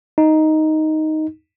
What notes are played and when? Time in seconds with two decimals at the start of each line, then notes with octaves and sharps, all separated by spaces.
0.18 D#4